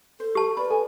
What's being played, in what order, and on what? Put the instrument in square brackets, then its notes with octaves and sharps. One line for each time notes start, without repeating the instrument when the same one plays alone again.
[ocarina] A4 [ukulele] C5
[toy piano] G4 A5
[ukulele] A#4 D5 [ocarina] B4 [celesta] B5
[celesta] A4 [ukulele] G#5